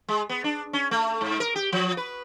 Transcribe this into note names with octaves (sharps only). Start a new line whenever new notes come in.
G#3
B3
D4
C#4
A3
G#2
A#4
G4
F3
B4